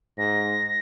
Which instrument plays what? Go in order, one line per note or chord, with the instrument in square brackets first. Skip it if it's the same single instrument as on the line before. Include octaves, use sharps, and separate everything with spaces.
[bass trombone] G#2 [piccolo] A#6